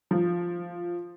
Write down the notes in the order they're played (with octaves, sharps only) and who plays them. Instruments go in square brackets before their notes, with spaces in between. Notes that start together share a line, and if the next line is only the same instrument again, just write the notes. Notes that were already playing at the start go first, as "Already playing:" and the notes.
[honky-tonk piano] F3